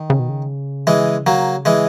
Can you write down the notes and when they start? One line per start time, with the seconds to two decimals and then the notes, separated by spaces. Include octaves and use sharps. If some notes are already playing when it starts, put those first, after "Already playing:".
Already playing: D#3
0.10 C#3
0.19 B2
0.29 C#3
0.87 E3 G#3
1.27 F#3 A#3
1.65 E3 G#3